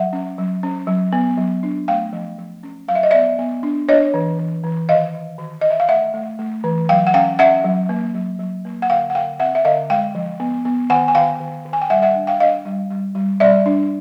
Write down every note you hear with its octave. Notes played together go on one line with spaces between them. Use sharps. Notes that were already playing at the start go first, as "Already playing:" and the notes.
Already playing: F#3 E5 F#5
C#4
F#3
C#4
F#3
B3
F#3
D4
A3 F5 G5
F3
F3
C#4
F#3 F5
E5
D#5
B3 D5 E5
B3
D4
D4 C#5 D#5
E3
E3
E3
D#3 D#5 F5
D#3
D#3
D#3 D#5
E5
F5
A3 E5 F#5
A3
A3
E3
F#3 F5 G5
F#5
C#4 F5 G5
C#4 E5 F#5
F#3
A#3
F#3
F#3
A#3
F#5
D3 F5 G5
F#5
D3 F5 G5
C4 E5 F#5
E5
D3 D#5 F5
G#3 F5 G5
F3
B3
B3
D#3 F#5 G#5
G#5
D#3 F5 G5
D#3
D#3
G#5
G5
G3 E5 F#5
E5 F#5
D4
F5 G5
D4 D#5 F5
G3
G3
G3
G3 D5 E5
D4